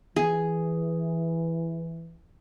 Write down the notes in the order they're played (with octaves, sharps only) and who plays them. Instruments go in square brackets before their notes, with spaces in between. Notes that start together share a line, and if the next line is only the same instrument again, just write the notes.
[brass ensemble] E3 [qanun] G#4